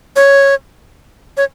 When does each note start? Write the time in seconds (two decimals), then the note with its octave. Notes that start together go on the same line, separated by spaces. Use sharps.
0.16 C#5
1.37 C#5